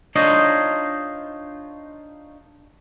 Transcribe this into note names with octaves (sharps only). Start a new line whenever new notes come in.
D4 D#4 F4 C5 C#5 D#5